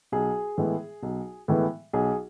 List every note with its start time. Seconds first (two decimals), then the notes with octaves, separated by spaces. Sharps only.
0.12 B1 G#4
0.58 A2 E3 G#3 B3
1.02 B1
1.48 A2 E3 G#3 B3
1.93 B1 G#4